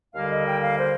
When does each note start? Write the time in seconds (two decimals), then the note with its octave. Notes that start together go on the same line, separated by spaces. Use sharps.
0.15 D#2 D3 G3 A#3 F5
0.31 D#5
0.47 G5
0.62 F5
0.78 C5